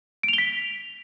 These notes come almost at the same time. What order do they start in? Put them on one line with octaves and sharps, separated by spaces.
D7 F7 G7 B6